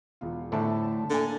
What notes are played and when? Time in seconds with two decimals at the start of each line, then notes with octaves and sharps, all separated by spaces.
0.21 E1 B3 F4
0.52 A2 D3 C5 E5 A5
1.10 D3 A#3 G#5